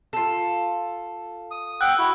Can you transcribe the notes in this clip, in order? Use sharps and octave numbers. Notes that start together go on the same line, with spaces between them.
F4 A4
D#6
F#5 G5 E6 F#6
E4 F#4